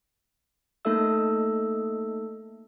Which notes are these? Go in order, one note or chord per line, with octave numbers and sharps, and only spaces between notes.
A3 A#3 D#4 A4 E5 E6